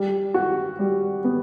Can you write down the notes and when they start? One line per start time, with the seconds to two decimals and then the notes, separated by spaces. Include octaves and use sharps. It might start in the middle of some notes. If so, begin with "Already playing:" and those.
Already playing: G3
0.34 F#4
0.79 G3
1.24 B3